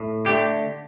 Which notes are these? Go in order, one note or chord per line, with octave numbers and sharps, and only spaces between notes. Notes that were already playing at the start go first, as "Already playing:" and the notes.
Already playing: A2
D3 A3 G4